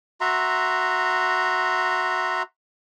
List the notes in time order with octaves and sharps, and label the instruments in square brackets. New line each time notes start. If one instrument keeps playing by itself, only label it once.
[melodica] F#4 E5 A#5 C6